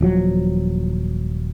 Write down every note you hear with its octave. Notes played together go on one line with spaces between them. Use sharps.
D#1 F3 F#3